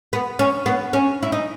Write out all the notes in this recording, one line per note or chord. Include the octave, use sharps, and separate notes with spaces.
B3
C#4
B3
C#4
E4
D#4